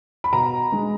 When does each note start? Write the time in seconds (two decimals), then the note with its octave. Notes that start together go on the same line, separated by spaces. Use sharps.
0.24 B5
0.33 B2 A#5
0.72 G#3